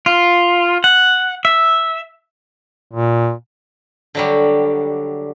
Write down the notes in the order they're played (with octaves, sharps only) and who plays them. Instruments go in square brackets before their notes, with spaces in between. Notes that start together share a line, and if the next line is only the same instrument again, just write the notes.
[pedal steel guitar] F4
F#5
E5
[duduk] A#2
[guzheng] D3 F#3 G3